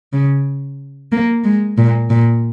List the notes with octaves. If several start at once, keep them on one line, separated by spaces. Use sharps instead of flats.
C#3
A#3
G#3
A#2
A#2